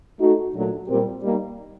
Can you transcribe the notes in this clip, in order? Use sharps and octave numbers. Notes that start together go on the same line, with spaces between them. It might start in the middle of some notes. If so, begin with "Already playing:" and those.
A3 D#4 F#4 A4
A#2 F#3 A3 D4
A#2 G3 C4 G4 A#4
G3 A#3 D#4